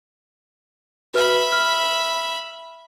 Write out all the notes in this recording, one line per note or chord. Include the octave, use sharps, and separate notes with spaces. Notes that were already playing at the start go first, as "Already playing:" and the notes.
F#4 B4 E5 B5 F6
F6